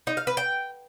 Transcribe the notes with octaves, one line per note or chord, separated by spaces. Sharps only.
D#4
F5
B4
G5